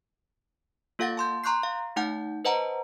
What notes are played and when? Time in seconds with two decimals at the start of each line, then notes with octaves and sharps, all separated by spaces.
0.99 A#3 F4 A4 F5 F#5 A6
1.17 A5 C6 G6
1.44 A#5 C6 C#6 F#6 G6 C7
1.63 F5
1.96 A3 D#4 F#5 A5 G6
2.45 B4 C5 D#5 F#5 A5 A#5